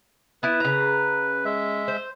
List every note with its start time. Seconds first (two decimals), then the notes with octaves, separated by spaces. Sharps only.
0.43 B3 E4 B4
0.60 C#3 A#5
1.45 G#3 E5
1.88 C5